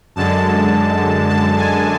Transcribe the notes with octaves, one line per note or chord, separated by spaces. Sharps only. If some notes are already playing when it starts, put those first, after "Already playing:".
F#2 D3 G#3 A5
A5
G#5